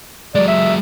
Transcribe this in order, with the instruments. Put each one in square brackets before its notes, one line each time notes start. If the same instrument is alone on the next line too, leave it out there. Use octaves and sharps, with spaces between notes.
[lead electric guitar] F#3 G#3 [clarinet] D5
[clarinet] E5